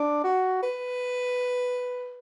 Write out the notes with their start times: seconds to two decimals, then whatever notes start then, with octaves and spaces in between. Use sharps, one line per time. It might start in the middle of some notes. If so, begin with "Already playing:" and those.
Already playing: D4
0.24 F#4
0.62 B4